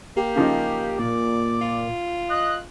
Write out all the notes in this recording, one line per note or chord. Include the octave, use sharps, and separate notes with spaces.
A#3 G4
C#3 F3 D#4
A#2 D5
F4
D#5 F#6